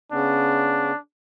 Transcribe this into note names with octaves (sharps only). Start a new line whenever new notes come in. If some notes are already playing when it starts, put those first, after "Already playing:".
C#3 B3 C#4 D4